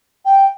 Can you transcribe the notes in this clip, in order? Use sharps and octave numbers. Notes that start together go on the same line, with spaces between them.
G5